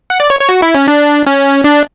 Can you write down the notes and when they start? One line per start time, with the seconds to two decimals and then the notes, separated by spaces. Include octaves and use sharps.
0.10 F#5
0.20 D5
0.30 C#5
0.40 C#5
0.49 F#4
0.62 E4
0.75 C#4
0.88 D4
1.27 C#4
1.64 D4